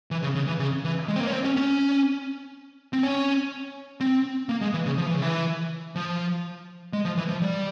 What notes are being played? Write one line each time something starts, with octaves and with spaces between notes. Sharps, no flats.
E3
C#3
C#3
E3
C#3
E3
G#3
C4
A#3
C#4
C4
C#4
C#4
C4
C#4
C4
A#3
G#3
E3
C#3
F3
E3
C#3
E3
F3
G#3
F3
E3
F3
G3